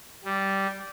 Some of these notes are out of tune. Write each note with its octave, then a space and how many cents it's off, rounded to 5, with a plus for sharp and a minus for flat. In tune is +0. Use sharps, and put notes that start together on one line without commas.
G3 -10